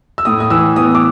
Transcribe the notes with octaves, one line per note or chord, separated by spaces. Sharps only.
E6
A2 D#6
D#6
E3 E6
B3 D#6
D6